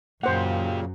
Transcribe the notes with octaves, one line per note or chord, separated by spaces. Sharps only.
F#2 A#2 C#3 A#3 G4 C5 F#5